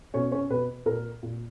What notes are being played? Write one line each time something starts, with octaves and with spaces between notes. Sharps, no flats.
B2 C#4 C#5
C#4 C#5
B2 B4
A#2 A#4
A#2